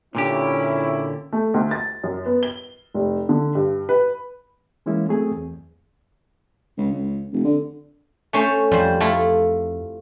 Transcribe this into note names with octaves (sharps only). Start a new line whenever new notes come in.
A#2 D3 C#4 E4 G4
A3
D2
A6
F#2
B3
G7
F1
D3
G2
B4
E3 G#3 A#3 C#4 E4
F#3 A3 C4 G#4
E2
C#2
C#2
F1
D3
A3 C#4 C5
F2 G3 C5
A3 E4 F4